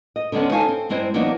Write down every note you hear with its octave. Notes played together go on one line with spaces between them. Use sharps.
D#5
D3 D#3 G#3 B3 C#4
D#4 C#5 F5 G#5 A5
C4
G2 G#3 C4 E4 C5
E3 F#3 A#3 B3 D4 D#4